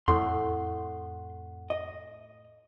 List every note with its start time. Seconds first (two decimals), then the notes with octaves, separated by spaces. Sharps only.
0.08 F2 A2 A3 F#5 C6
1.70 D#5